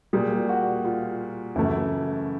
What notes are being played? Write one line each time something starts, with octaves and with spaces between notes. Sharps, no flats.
A#2 G3 G#4
F#4
F4
F#2 C#3 E3 A3 E4